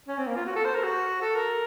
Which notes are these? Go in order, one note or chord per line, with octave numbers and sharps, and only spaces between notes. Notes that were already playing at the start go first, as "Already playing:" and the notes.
C#4
C4
A#3
F4
F#4
A4
C5
A#4
F#4
A4
A#4